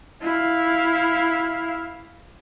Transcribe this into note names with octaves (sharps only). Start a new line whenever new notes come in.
E4 F5